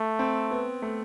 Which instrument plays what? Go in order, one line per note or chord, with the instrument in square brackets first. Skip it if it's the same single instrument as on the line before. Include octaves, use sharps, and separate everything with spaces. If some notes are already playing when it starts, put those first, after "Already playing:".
Already playing: [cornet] A3
[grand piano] C4
B3
A3